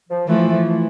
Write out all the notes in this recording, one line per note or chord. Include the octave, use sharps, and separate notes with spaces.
F3
E3 F3 A3